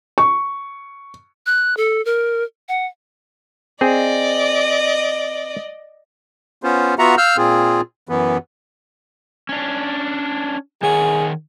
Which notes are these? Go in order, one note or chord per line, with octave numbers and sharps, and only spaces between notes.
C#6
F#6
A4
A#4
F#5
C4 G#4 D5 D#5
B3 C#4 F4 C5
B3 F4 F#4 E5 F#5 A#5
F5 E6 F6 G6
A#2 C4 F4 G#4
F#2 E3 B3
C#4 D4
D#3 G#4 C#5 F#5